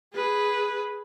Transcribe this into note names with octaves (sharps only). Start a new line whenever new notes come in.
G#4 B4